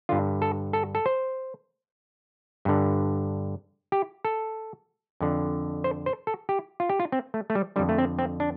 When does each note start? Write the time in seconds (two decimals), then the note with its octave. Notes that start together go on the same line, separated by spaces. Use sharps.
0.09 G2 D3 F4
0.42 A4
0.73 A4
0.95 A4
1.06 C5
2.65 G2 D3
3.92 G4
4.25 A4
5.21 F2 D3
5.84 C5
6.06 C5
6.27 A4
6.49 G4
6.80 F4
6.90 G4
7.00 F4
7.12 C4
7.34 A3
7.50 A3
7.55 G3
7.76 D3 G3
7.79 F2
7.89 A3
7.98 C4
8.19 C4
8.40 D4